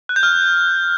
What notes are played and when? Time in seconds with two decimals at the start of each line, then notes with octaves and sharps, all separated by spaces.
0.09 F#6
0.16 G6
0.23 F6